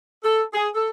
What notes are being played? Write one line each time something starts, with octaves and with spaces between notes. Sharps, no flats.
A4
G#4
A4